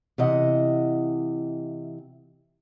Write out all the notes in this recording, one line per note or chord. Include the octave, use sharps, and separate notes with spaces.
C3 E3 D#5 F#5